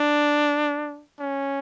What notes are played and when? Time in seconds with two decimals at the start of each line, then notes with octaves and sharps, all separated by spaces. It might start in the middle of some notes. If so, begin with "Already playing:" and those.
Already playing: D4
1.19 C#4